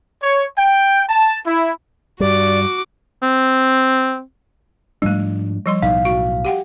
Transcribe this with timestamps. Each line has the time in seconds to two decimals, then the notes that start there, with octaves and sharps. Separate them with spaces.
0.22 C#5
0.57 G5
1.09 A5
1.47 E4
2.20 G2 G3 F#4 D5 D6
3.23 C4
5.02 G#2 F3 G3 A3 D4
5.66 F3 G3 C6
5.82 B1 A2 D#4 F5
6.05 F#4
6.45 G4 F#5 G5